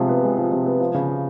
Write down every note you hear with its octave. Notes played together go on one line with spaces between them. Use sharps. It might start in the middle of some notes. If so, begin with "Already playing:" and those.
Already playing: C3 F3 G#3
B3
G#3
F3
C3
B3
F3
C#3